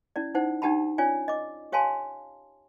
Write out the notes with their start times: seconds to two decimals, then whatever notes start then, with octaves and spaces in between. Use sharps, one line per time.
0.16 C#4 E4 D5
0.35 D#4 E4 C5 F#5
0.62 D4 D#4 G4 F#5 A5 B5
0.98 C#4 F4 C#5 D5 G#5
1.28 D#5 D6
1.72 G4 C#5 F5 G#5 A5 C6